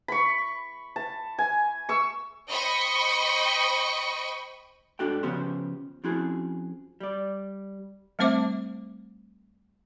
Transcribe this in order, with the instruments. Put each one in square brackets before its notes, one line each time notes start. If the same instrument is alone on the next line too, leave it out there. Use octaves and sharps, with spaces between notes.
[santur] B5 C#6
A5
G#5
C#6 E6
[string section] C5 D#5 G5 B5 C#6
[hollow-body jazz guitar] G#2 D4 F#4 A4 G5
C#3 F3 B3 C#4 G4 C5
F3 C4 C#4 E4 F#4 G#4
G3 D5
[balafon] G3 A3 C4 C5 E5 D6